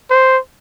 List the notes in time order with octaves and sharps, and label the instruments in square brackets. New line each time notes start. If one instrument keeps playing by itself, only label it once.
[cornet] C5